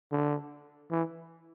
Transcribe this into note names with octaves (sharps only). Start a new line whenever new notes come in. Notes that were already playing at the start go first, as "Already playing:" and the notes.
D3
E3